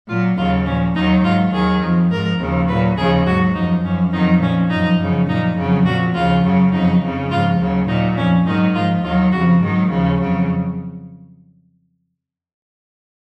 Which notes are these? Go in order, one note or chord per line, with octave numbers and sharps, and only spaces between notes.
A#2 F#3 F4
D#2 C#3 F#3 F4
A#2 F3 C#4
D#2 D#3 F#3 D#4
G#2 F#3 F4
D#2 D#3 F#3 G#4
F2 F3
G#2 F3 A#4
D#2 C#3 F3
A#2 F#3 B4
D#2 C#3 F3 G#4
G#2 F#3 F#4
F#2 F3 D#4
F#2 F3 C#4
F2 D#3 F#3 D#4
A#2 F3 C#4
F#2 F3 D#4
F#2 C#3 F3
A#2 F3 D#4
F2 C#3 F#3
A#2 F3 F#4
D#2 C#3 F3 F4
F#2 C#3 F#3
F2 C#3 F#3 D#4
F2 C#3 F3
G#2 F3 F4
D#2 C#3 F#3
A#2 F#3 D#4
F2 F3 C#4
G#2 D#3 F#3 D#4
G#2 F3 F4
D#2 D#3 F#3 F4
F2 C#3 F3 F#4
G#2 D#3 F#3
D#2 C#3 F3
F2 C#3 F#3